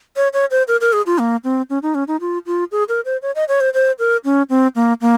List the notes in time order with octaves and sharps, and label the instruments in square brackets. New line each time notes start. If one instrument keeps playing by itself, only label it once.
[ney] C#5
C#5
C5
A#4
A#4
G#4
F4
A#3
C4
C#4
D#4
C#4
D#4
F4
F4
G#4
A#4
C5
C#5
D#5
C#5
C5
C5
A#4
C#4
C4
A#3
A#3